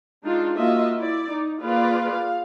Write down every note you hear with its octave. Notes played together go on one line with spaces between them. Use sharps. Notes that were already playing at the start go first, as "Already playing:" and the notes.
G#3 D4 D#4 F4
A#3 F4 F#4 D#5 E5
E4 D5
D#4
A#3 F4 G#4 B4 D5 F5
F5